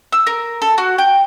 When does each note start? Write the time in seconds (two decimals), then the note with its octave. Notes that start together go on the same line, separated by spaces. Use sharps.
0.13 E6
0.27 A#4
0.62 A4
0.78 F#4
0.98 G5